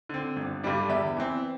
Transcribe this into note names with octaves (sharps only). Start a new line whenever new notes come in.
D3 C4
G1
G2 D3 G3 D4
E2 E5
E3 C4